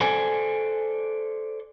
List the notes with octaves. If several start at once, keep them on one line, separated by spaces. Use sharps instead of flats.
A4 C5 D5 G#5